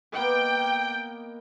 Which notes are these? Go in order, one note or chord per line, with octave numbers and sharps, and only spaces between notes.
A#3 B3 D#5 G5